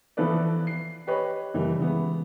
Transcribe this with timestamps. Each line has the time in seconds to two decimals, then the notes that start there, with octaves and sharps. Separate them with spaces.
0.17 E3 F3 B3 A4 B4 D5
0.67 C7
1.07 G4 B4 C#5 D#5
1.54 F#1 E3 G3
1.79 C#3 E3 G#3 B3